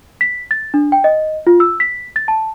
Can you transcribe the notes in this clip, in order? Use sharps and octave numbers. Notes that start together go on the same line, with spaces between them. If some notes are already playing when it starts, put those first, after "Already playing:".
B6
A6
D4
G5
D#5
F4
E6
B6
A6
A5